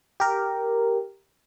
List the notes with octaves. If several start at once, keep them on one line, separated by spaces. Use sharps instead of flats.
G4 A#4